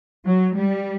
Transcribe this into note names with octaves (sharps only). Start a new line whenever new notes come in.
F#3
G3